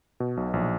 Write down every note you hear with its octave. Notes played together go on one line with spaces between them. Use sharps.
B2
B1
A#1